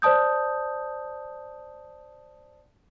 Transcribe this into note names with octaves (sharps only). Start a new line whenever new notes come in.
C5 D5 A5 D#6 G6